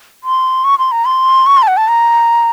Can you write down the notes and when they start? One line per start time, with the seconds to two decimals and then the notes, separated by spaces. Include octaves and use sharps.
0.24 C6
0.64 C#6
0.79 C6
0.92 A#5
1.05 C6
1.46 C#6
1.57 C6
1.62 A5
1.68 F#5
1.77 A5
1.88 A#5